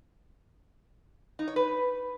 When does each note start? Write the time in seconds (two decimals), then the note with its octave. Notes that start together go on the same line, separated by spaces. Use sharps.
1.39 D#4
1.48 C#5
1.56 B4